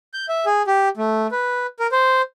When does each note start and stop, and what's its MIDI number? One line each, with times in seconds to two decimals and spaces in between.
0.14 0.26 91
0.29 0.45 76
0.46 0.62 68
0.67 0.89 67
0.97 1.27 57
1.31 1.66 71
1.79 1.87 70
1.92 2.22 72